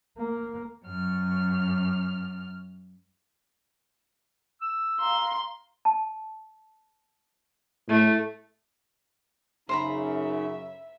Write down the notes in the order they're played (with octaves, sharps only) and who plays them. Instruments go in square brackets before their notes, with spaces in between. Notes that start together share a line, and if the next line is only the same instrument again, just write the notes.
[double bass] A#3
[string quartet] F#2 F6
[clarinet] E6
[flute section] F5 A#5 [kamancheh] C6
[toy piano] A5
[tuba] A2 [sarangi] A3
[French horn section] F#2 C#3 [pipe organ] D#4 [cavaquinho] C5 A#5 B5 [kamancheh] E5